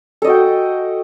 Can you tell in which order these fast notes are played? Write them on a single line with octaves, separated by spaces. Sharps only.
A4 D#5 F#4 G5